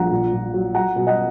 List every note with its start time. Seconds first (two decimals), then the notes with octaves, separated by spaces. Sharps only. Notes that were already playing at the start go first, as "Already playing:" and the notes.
Already playing: A#1 F#5 A#5
0.11 A#2
0.33 A#2
0.54 F#3
0.75 F#3 F#5 A#5
0.96 B2
1.07 D#5 F#5